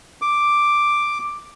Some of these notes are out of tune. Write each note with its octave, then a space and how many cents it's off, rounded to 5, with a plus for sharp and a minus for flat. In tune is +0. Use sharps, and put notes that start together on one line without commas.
D6 +5